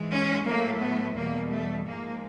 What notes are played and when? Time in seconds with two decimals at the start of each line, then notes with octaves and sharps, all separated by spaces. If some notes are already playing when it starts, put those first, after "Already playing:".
Already playing: G#2 E3 G#3
0.12 C#4
0.46 A2 F#3 A3 A#3
0.82 B3
1.16 E2 B2 G3 A#3
1.52 A3
1.87 G#2 F3 G#3 A#3